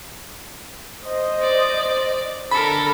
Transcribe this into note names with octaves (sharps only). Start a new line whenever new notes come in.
C5 D#5
D5
D3 A4 A#4 B5